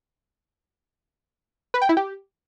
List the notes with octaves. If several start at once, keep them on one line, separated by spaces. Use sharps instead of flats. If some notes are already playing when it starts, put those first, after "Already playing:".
B4
G5
E4
G4